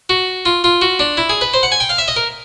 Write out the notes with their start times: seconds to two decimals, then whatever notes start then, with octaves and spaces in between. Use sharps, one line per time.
0.09 F#4
0.45 F4
0.64 F4
0.81 F#4
0.99 D4
1.17 E4
1.29 G#4
1.41 B4
1.54 C5
1.63 F#5
1.72 G#5
1.80 G5
1.89 F5
1.98 E5
2.08 D#5
2.16 A#4